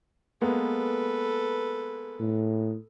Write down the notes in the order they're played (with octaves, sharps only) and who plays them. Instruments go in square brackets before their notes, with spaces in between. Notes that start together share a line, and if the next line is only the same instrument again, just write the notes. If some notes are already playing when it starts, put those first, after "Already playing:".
[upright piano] G#3 A#3 B3 [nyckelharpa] A4 B4
[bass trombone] A2